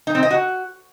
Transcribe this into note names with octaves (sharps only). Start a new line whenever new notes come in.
D#4
C4
D#5
F#4